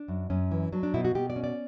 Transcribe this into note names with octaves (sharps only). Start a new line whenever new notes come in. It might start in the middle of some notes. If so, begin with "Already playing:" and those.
Already playing: D4
F#2
F#2 C#4
E3
F#3 D4
D4
B2 E4
F#4
B2 G4
D5
C#4
D5